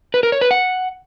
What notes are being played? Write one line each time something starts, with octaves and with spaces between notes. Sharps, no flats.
B4
A#4
C#5
B4
F#5